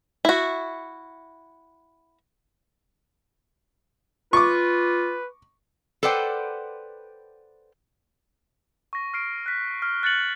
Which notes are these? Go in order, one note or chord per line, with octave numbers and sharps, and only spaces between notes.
E4 F#4
F4 B4 C#6 D6
A4 B4 C5 D5 F#5 G5
C#6 A#6
F6 C7 D7
F#6 B6
F6
F#6 A6 C#7 F#7